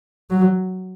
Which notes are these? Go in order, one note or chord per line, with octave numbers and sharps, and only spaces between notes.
F#3